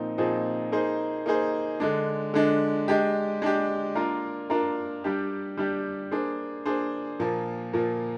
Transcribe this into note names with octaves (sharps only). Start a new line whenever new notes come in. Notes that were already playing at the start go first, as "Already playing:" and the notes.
Already playing: A#2 F3 C4 D#4
A#2 F3 C4 D#4 G#4
A#3 D#4 G#4 C5
A#3 D#4 G#4 C5
D3 G#3 D4
D3 G#3 D4
G#3 D4 G4
G#3 D4 G4
A#3 D4 F4 A#4
A#3 D4 F4 A#4
G3 D4 G4
G3 D4 G4
A#3 D4 G#4 C5
A#3 D4 G#4 C5
A#2 F3 A#3
A#2 F3 A#3